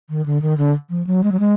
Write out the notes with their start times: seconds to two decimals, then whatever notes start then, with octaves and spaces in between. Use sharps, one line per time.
0.10 D#3
0.26 D3
0.42 D#3
0.58 D3
0.90 F3
1.07 F#3
1.24 G#3
1.32 F#3
1.40 G#3